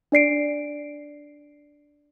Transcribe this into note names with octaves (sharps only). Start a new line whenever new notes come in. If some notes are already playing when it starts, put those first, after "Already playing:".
D4 D5 C7 D7